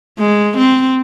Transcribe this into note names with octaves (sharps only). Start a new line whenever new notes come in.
G#3
C4